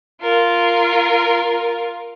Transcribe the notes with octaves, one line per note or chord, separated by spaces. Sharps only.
F4 A#4